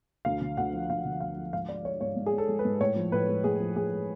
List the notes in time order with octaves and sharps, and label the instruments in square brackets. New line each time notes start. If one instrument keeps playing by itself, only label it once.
[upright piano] D2 F5
D3
D2 F#5
F3
D2 F5
D3
D2 F5
F3
G#2 F5
G#3 D5
G#3 C#5
G#2 C#5
G#2
G#4
G#3
A4
G#3
B4
G#2
A2 C#5
F3
A2 B4
G#3
A2 G#4
F3
A2 G#4
G#3